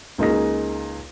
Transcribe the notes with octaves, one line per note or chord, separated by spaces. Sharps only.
C#2 A#3 D#4 G#4 A#6